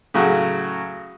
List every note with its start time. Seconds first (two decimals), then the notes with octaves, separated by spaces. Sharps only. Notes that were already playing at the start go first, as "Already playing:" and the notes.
0.14 A2 C#3 F#3 F#4